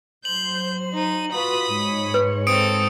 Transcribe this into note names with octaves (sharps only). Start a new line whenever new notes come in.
F#3 C5 G6 F#7
D#4 D#7
F4 F#4 B4 B5 D#6
G#2 G#3 C#5
B4
C4 A4 D#6 C#7 D7